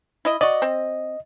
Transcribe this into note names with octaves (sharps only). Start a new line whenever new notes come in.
E4 D#5
F#4 D5 D#5
C4